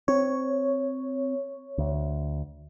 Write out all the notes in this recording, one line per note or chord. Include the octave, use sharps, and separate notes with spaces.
C4 C#5
D2